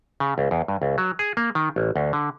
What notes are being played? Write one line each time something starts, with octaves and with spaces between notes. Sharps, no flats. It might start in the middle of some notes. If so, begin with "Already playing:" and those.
C#3
C#2
E2
G2
C#2
F#3
G#4
A#3
D#3
A1
D2
D3